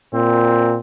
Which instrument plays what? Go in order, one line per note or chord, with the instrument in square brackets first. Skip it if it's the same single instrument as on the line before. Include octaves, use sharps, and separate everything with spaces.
[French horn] A#2 [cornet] C4